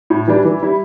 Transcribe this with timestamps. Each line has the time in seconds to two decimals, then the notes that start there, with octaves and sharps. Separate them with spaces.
0.10 A2
0.27 E3 G3 D4
0.45 E3
0.62 G3 E4